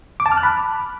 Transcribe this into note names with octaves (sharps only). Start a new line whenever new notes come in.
D6
A5
F6
F#6
B5